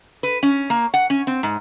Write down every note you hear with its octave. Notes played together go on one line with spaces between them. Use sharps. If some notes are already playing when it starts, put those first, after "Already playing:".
B4
C#4
A#3
F#5
C#4
C4
G#2